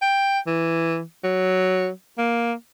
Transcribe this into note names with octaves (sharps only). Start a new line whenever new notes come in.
G5
E3
F#3
A#3